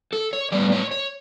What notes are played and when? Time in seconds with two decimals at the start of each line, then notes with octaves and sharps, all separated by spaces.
0.13 A4
0.33 C#5
0.52 A2 G3 B3 D5
0.72 C#5
0.91 C#5